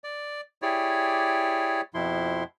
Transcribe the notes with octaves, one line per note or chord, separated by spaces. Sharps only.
D5
E4 G4 G#4 C#5 D5
F2 B2 F3 E4 C6